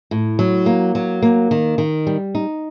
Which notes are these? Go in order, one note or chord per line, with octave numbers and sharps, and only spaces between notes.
A2
F#3
A#3
F#3
A#3
D#3
D#3
G3
D#4